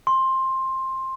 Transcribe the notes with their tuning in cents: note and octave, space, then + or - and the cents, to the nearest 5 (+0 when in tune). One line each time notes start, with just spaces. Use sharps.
C6 +15